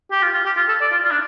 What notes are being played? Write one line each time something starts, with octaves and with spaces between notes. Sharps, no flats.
G4
F4
F4
G4
F4
A4
D5
F4
F4
D4